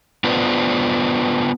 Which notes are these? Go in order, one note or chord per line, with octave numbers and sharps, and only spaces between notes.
B3 D4 F4 B4 C5